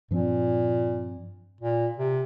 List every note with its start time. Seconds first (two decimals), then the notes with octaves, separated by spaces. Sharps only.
0.11 G2 A#2 F3 C4
1.61 A#2
1.98 C3